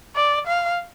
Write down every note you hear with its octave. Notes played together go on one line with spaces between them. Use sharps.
D5
F5